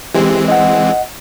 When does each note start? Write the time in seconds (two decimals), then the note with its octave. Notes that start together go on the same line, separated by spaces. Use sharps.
0.15 E3 G#3 C4 G4
0.48 D#5 F#5